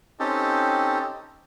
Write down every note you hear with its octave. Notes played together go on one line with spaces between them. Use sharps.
C4 C#4 D#4 G4 A4